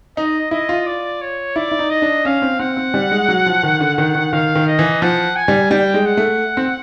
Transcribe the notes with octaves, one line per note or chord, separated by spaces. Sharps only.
D#4 D#5
E4 D#5
F4
D5
C#5
E4 D5
E4
D#4
D#5
D4
C#4 F5
C4
C4 F#5
C4
G3
G#3
F#3
F3
D#3
D3
D#3
D#3
D#3 F5
D#3
D#5
E3
F3 F#5
G#5
G3
G3 G5
G#3
F#5
A3
C4